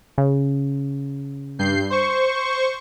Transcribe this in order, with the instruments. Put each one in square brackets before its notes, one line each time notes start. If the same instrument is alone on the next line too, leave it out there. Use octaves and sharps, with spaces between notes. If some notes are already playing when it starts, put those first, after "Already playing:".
[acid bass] C#3
[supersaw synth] G2 G6 C7
C5 C#6